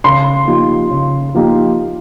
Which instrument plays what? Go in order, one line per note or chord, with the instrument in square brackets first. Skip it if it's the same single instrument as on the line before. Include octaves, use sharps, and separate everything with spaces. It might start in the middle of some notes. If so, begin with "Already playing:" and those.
[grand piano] C#3 [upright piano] C6
[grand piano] F3 A#3 D#4 G4
C#3
F3 A#3 D#4 G4